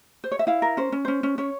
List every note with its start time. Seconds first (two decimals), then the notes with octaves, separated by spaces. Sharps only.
0.24 C5
0.32 C#5
0.39 E5
0.47 E4 F5
0.62 A#4
0.77 C#4 C5
0.92 C#4
1.05 C#4 C5
1.23 C#4
1.38 C#4 C#5